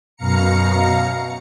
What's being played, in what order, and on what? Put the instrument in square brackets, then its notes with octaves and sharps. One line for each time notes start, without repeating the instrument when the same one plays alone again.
[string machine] F#2 B2 F5 A#5 C#7